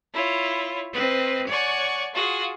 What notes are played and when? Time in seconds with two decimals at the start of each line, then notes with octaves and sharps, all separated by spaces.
0.13 E4 F4 C#5
0.93 C4 B4 D#5
1.48 C#5 D5 F#5 G#5 C#6
2.14 F4 F#4 G#4